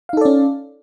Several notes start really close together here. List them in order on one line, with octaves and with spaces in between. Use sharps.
F5 D#4 A4 D5 C#4